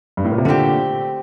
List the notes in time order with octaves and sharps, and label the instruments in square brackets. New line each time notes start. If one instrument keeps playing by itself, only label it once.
[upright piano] G2
A2
A#2
C3
[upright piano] A#2 D3 [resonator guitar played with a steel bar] A3 C4 G4